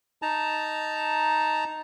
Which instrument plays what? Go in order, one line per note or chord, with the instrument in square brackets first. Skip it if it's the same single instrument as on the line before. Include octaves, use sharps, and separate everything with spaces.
[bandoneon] D#4 A5 A#5